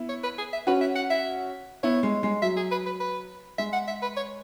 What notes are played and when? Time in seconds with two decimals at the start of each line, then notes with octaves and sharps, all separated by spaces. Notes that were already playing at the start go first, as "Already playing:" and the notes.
Already playing: B3 E4
0.09 C#5
0.23 B4
0.38 G#4
0.53 E5
0.67 C#4 F#4 B4
0.81 E5
0.96 F#5
1.10 E5
1.83 B3 E4 C#5
2.03 G#3
2.23 G#3
2.42 F#3 E5
2.57 G#4
2.71 B4
2.86 B4
3.00 B4
3.58 G#3 E5
3.73 F#5
3.88 E5
4.02 B4
4.17 C#5